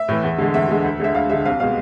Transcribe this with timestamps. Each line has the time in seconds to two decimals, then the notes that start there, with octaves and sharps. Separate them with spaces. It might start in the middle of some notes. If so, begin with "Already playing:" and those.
Already playing: E5
0.09 A2 E3
0.23 E2
0.38 D3 G#3
0.54 E2 E5
0.69 D3 G#3
0.84 D2
1.00 D3 G#3 E5
1.15 D2 F5
1.29 D3 G#3 E5
1.45 C2 F5
1.60 B2 G#3 F5